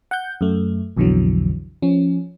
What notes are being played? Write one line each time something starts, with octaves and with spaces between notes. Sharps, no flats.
F#5 G6
F#2 A3
B1 F2 B2 D3 E3 F#3
F3 C#4